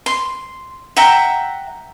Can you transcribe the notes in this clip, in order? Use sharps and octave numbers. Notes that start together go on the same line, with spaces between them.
C6
E5 F#5 G5 A#5